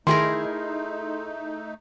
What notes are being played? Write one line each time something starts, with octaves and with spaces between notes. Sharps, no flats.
D#3 A3 D#4 E4 G#4 A#4 C6